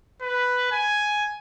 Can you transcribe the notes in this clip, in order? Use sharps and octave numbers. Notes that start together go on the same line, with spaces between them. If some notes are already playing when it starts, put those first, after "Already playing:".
B4
G#5